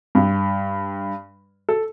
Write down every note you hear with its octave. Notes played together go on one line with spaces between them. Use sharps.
G2
A4